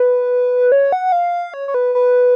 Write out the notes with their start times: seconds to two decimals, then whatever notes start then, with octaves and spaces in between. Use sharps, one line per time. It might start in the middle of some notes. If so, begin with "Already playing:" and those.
Already playing: B4
0.72 C#5
0.92 F#5
1.12 F5
1.54 C#5
1.68 C#5
1.74 B4
1.95 B4